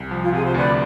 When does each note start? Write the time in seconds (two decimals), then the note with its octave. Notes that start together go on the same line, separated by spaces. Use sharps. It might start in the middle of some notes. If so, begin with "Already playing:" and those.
Already playing: C2
0.11 F3
0.21 F4
0.33 C3 G#4
0.44 C5
0.54 D2 B4 D5